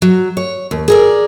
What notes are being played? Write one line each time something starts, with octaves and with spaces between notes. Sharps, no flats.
F#3
C#5
D#2
G#4 A#4 D5